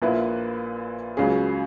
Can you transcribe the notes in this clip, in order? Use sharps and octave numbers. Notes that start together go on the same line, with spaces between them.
A#1 A#2 A#3 E4 B4
C#2 C#3 F#3 C#4 G#4